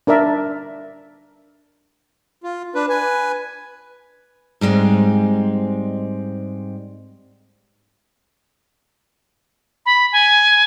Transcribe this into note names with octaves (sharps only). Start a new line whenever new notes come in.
D4 A#4 D5 E5
F4
D4 B4
B4 G#5
G#2 G3 G#3 C4
B5
G#5